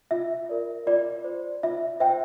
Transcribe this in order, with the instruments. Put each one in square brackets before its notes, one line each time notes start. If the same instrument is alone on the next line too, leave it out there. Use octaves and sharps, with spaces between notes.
[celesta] F4 E5
A#4 D5
F4 D5
C5
F4 E5
C5 E5 G5